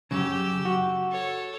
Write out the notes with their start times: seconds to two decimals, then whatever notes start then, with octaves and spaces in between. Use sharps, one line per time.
0.11 F#2 C#3 G4 E6
0.65 F#4
1.11 A4 C#5